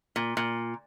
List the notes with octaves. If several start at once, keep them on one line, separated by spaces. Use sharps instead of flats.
A#2
A#2